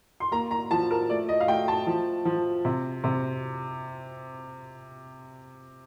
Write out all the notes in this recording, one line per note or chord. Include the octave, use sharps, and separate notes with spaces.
C6
A#3 A#5
A#5
F3 A5
A#4
A3 D5
D#5
F5
A3 G5
A5
F3
F3
C3
C3